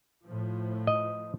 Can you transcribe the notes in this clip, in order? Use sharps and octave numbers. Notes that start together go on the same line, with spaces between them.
A2 F3
D#5